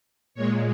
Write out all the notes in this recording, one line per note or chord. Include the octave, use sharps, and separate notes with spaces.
A#2 G#3 C#5